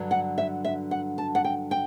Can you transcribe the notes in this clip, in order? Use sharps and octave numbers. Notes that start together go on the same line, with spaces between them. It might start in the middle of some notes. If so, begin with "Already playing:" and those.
Already playing: G2 D3 F#3
F#5
E5
E5
F#5
A5
F#5
G5
G5